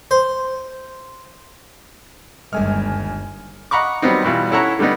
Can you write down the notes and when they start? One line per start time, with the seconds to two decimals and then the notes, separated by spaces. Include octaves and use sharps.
0.11 C5
2.53 G1 D#2 G3 G#3 G#5 F6
3.71 D#5 F#5 A#5 B5 C#6 D6
4.02 D#3 F#3 G3 B3 C4 D#4
4.24 B2 E3 G3 F4
4.51 C#4 E4 A4 C#5 F#5 A#5
4.79 D3 G3 A3 B3 D#4